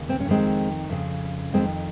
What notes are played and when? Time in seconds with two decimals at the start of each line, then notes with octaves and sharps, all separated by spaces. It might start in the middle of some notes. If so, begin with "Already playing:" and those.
Already playing: D#2 C#3
0.09 C4
0.20 C#4
0.26 F2 D#3 G#3 C4
0.89 F2 C#3
1.53 F2 D#3 G#3 C4